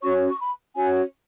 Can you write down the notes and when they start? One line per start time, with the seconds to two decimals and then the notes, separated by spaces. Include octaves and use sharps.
0.02 C#4 F#4 C#5 C#6
0.28 C#6
0.39 B5
0.76 C#4 F#4 C#5 G#5